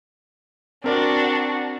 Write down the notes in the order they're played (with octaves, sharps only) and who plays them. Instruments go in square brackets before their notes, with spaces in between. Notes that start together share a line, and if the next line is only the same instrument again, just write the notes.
[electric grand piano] C4 A#4 D5 [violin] D4 F#4